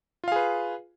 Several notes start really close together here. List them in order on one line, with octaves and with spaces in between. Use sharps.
F4 F5 G#4 B4